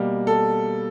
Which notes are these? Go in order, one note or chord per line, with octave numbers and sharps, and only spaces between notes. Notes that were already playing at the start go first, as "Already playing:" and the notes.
Already playing: B2 G3 A#3
A4